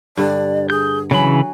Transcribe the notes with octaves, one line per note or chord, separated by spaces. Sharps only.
G2 D3 D5
G#4 G6
C#3 E3 F#3 G#5 B5